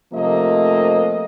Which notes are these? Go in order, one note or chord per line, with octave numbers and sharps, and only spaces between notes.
C3 F3 A3 A#3 D#5